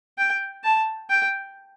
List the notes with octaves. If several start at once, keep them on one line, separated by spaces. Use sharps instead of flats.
G5
A5
G5